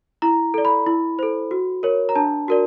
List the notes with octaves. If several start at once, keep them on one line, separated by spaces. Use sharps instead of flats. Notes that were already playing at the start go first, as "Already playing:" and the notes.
E4 A#5
A4 D5
B5
E4
A4 C5
F#4
A#4 C#5
A#5
D4 A5
F#4 A#4 D5